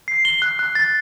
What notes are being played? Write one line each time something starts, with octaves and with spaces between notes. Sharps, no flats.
C7
G7
F#6
F#6
A6